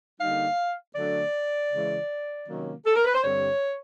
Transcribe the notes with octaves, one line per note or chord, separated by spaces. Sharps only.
D3 G3 A#3 D#4 F5
D3 F#3 A3 D4 D5
C#3 E3 G#3
C3 D#3 F#3 A#3 C#4
A4
A#4
B4
C5
G2 D3 G3 C4 C#5